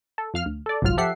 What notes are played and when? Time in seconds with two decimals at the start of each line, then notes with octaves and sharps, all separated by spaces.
0.18 A4
0.34 F2 F5 F6
0.46 D2
0.66 A4 D5
0.82 G1 C2 G#2 F#3 F4 F6
0.98 F3 G4 A4 E5 F#5 C7